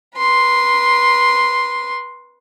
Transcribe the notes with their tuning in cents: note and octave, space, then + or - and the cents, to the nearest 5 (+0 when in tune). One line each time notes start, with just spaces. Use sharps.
B4 -30 C6 +0